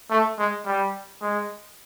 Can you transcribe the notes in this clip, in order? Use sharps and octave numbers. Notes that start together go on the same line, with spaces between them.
A3
G#3
G3
G#3